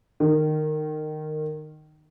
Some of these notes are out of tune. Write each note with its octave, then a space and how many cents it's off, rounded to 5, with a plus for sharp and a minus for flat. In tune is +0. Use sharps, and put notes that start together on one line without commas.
D#3 -20